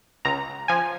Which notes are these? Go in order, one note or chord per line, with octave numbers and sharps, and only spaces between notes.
C#2 A#5
F3 G#5